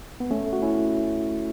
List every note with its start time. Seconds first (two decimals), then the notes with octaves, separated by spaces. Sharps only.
0.20 B3
0.31 A3 C#4
0.53 F#4
0.62 C#4 E4